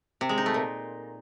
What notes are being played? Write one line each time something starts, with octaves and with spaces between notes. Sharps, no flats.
C3
G#3
D#4
A3
A#2